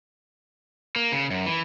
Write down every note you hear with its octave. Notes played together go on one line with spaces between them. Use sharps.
A#3
C#3
F#2
E3